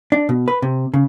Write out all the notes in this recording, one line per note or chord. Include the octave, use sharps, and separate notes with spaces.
D4
B2
B4
C3
C#3